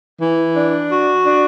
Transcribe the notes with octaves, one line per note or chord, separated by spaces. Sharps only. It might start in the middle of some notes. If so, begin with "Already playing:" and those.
E3
D4
F#4
D4